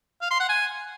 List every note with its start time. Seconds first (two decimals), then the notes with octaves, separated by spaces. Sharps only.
0.22 F5
0.31 C6
0.40 F#5
0.49 G#5